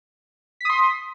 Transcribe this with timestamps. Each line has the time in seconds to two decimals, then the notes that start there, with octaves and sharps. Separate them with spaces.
0.61 B6
0.65 D#6
0.70 C6